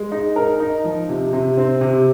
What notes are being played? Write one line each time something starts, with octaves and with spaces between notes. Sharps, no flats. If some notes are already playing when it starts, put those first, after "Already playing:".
Already playing: G#3
D#4
A#4
D#4
F3
C3
C3
C4
C3